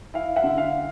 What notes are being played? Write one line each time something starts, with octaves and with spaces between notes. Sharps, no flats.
E4 F5
E5 F#5
D3
F5
E4